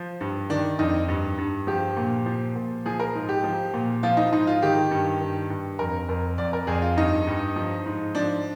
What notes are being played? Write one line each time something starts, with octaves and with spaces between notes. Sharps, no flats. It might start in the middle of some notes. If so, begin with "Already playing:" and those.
Already playing: F3
G2
D#3 D4
F2 D#4
G2
G2
F3 G4
A#2
F3
A#2
F3 G#4
A#4
G#2
G4
F3
A#2
F3 F4
D#4
G#2 D#4
F4
D#3 G4
G2
D#3
G2
F2 A#4
F2 A#4
F2 D5
A#4
F2 G#4
F4
G2 D#4
G2
F3
G#2
F3 D4